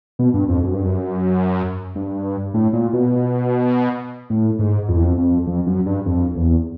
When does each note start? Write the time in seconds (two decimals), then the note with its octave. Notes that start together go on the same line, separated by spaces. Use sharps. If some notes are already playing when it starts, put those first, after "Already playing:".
0.19 B2
0.34 G2
0.49 F2
0.64 F#2
0.74 G2
0.84 F#2
1.96 G2
2.54 A2
2.73 A#2
2.93 B2
4.30 A2
4.59 G#2
4.88 F2
4.96 E2
5.03 F2
5.18 F2
5.47 F2
5.67 F#2
5.86 G2
6.06 F2
6.35 E2